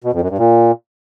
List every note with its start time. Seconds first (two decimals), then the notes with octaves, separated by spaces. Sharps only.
0.04 B2
0.13 F2
0.21 F#2
0.30 G2
0.38 A#2